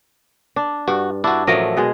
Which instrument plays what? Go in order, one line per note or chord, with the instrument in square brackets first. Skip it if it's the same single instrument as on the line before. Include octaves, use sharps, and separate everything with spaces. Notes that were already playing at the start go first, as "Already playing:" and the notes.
[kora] D4
[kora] G2 [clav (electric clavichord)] F#4
[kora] D4 [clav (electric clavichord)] E4 F#4
[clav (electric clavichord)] A1 F3 A3 [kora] F#3 A#4 D#5
[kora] B2 G#3 G#4